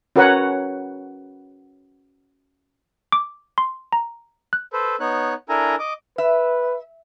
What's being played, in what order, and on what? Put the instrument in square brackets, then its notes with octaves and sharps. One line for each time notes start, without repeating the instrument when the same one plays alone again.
[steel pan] C#4 F#4 A#4 B4 C#5 F#5
[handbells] D6
C6
A#5
F#6
[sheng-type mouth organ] A4 B4 C5
B3 D#4 C#5 F#6
D4 E4 A4 A#4 G#5 A#5
D#5 D6
[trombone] B4 [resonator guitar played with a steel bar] E5